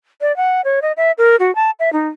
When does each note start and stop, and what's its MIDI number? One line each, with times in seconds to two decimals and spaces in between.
0.21 0.35 74
0.37 0.61 78
0.64 0.80 73
0.82 0.92 75
0.97 1.12 76
1.18 1.36 70
1.40 1.54 66
1.55 1.71 81
1.80 1.92 76
1.93 2.07 63